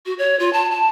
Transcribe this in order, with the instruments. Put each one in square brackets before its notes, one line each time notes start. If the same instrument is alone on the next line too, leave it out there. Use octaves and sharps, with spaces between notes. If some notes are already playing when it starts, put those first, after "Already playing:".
[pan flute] F#4
C#5
F4
A5
A5